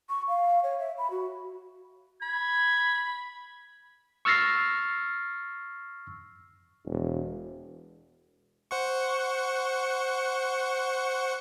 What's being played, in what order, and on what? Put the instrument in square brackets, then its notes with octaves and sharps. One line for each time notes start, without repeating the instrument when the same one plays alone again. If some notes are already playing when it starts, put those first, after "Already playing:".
[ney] C#6
F5
C#5
E5
B5
F#4
[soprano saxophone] B5 [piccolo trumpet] G#6
[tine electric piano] C#6 E6 F6 A6 A#6 C7
[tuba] E1
[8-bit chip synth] C5 F#5 C#6